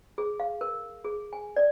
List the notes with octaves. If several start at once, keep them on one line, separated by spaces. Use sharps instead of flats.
G#4
F5
A#4
G#4
G#5
D5